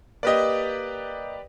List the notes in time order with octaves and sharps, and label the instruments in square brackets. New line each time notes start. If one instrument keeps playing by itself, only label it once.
[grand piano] A#3 D#5 [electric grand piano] G4 B4 D5